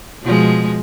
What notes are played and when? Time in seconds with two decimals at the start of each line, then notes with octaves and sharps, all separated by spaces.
0.23 B2 F3 G#3